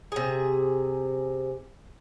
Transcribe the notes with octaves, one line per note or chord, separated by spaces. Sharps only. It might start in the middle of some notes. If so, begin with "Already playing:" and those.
C3 G#4